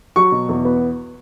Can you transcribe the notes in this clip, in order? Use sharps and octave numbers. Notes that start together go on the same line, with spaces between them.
F#3 C#6
B2
E2
B3